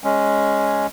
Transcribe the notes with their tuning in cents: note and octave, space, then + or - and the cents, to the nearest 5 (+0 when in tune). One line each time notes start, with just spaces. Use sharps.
G#3 +0 C#4 +0